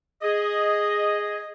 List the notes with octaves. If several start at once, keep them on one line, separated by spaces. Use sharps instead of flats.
G#4 D#5